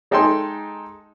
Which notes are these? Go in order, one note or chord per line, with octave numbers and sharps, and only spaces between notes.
G#3 D#4 A4 G5 G#5 C6